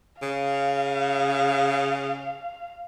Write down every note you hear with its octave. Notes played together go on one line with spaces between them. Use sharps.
C#3 F5